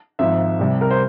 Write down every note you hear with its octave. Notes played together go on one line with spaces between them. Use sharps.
G#1 G#2 F3 E5
C2 C3 G3
A#4
C5